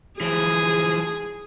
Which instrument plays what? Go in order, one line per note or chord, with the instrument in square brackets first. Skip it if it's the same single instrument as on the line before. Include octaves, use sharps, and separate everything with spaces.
[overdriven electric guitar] E3 F3 [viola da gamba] G#4